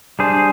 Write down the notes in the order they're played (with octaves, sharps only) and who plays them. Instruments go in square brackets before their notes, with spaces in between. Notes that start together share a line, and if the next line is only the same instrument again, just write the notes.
[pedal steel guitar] G3 D4 G#4 C5